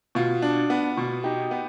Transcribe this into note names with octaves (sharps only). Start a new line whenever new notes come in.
B2 F4
D4
B3
B2
D#4 G4
B3